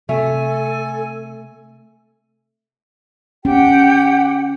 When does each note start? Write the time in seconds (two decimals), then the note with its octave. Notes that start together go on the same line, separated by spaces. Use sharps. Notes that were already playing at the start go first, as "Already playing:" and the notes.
0.09 C3 A3 A4 G#5
3.45 C#4 G4 F#5 G5